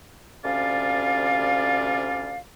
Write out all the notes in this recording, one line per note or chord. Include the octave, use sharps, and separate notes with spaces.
D2 C3 C#4 F4 D5 F5